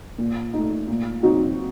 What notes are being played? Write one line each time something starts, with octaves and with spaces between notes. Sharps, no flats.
A#2
A3 D#4
A#2
F#3 C4 D#4 F#4